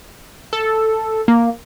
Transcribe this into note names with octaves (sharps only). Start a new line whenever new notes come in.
A4
A#3